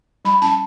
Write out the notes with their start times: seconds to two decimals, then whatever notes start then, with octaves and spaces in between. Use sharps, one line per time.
0.25 G3 B5
0.42 C#4 A5